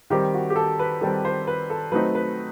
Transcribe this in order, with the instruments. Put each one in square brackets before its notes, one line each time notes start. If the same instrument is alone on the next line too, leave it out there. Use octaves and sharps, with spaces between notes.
[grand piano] D#3 G3 C4 G4
F#4
G4
A4
B4
D#3 G3 C4 A4
C5
B4
A4
F#3 A3 C4 D#4 B4
B4